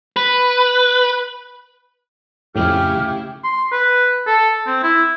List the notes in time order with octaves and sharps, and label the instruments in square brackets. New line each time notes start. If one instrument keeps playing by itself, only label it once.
[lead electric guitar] B4
[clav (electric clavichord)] F2 A2 [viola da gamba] C#3 A3 E4 [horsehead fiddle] G4 [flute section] F6
[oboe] C6
B4
A4
C4
E4